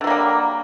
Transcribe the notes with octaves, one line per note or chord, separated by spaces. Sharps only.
D3 F#3 G3 A#3